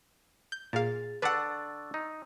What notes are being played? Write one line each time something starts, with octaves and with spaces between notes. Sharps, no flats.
G6
A#2 G#4 F5 A6
D3 D4 B4 F#5 C#6 E6 A6
D#4